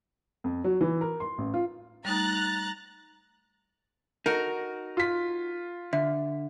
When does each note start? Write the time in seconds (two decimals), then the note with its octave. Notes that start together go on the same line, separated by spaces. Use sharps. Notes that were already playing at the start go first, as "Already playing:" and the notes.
0.44 F2
0.64 F#3
0.81 E3
1.01 A#4
1.20 C6
1.38 A1
1.54 F4
2.05 G3 A3 D#4 A#5 F#6 A6
4.26 D#4 F#4 A#4
4.97 F4 B6
5.93 D3 E5